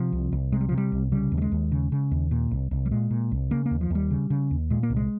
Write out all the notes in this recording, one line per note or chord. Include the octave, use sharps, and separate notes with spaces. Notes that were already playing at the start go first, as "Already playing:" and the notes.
Already playing: C3 F3
C2
C2
C3 G#3
G3
C3 F3
G3
C2
C#3 G3
D#2
G3
G#3
D#2
C#3
C#3
D#2
A#2
C2
C2
G3
A#2 G#3
A#2
C2
C#3 A#3
A#3
D#2
F3
D#2 G3
C#3
C#3
D#2
A#2 G#3
A#3
C2
G#3